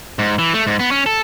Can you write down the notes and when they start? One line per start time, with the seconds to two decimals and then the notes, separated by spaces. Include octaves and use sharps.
0.19 G#2
0.39 E3
0.54 A3
0.67 G#2
0.80 B3
0.91 C#4
1.06 A4